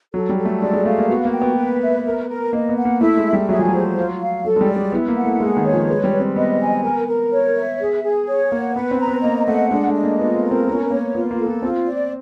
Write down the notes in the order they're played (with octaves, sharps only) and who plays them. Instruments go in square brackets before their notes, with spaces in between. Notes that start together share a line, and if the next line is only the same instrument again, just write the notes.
[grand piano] F#3 [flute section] A4
[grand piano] G3
[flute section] A4
[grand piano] A3
[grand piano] G#3 [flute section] D5
[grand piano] G#3
[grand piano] A3 [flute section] F5
[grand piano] A#3
[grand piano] B3 [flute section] F#4
[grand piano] A#3
[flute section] G5
[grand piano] B3
[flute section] B4
E5
A#4
A#4
[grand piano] A#3 [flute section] D#5
[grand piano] B3
[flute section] F#5
[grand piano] A#3
[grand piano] A3 [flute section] E4
[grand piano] G#3
[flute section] E5
[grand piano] G3
[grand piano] F#3 [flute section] G#4
[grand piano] F3
[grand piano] F#3 [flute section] C5
[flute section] F4
F5
[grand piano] F#3 [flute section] A4
[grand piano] G#3
G3
[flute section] D5
[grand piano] G#3
[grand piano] B3 [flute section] E4
[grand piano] A#3
[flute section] F#5
[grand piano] A3
[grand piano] G#3 [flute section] G#4
[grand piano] D#3
[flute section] C#5
[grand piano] F3
[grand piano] G#3 [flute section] B4
[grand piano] G3
[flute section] B4
[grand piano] C4
[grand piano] B3 [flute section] D#5
[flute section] G#5
A#4
A#4
C#5
E5
G#4
G#4
C#5
[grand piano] A#3 [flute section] F#5
[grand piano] B3 [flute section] B4
[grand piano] C4
[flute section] A#5
[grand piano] B3
[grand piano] A#3 [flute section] D#5
[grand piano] A3 [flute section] F#5
[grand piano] G#3 [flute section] D4
[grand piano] A3
[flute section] D#5
[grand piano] A#3
[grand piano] B3 [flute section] F4
[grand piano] C4
[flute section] A#4
[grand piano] C4
[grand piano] B3 [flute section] C#4
[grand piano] A#3 [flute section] C#5
[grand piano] B3 [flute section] F4
[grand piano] A#3
[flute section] A4
[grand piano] B3
[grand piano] C4 [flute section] F4
[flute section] D5